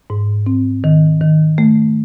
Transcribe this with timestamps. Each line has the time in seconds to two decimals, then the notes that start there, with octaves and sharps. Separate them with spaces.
0.10 G#2
0.46 C4
0.84 D#3
1.21 D#3
1.58 A3